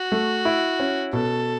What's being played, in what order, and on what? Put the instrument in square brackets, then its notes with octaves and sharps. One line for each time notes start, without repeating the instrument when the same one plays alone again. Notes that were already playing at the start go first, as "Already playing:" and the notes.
Already playing: [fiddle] F#4
[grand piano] A3
E4
C#4
[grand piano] B2 [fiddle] A4